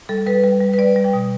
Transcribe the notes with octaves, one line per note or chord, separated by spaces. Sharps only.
G3 A4
G3 B4
G3
G3
B4
G3 D5
G3
G5
B2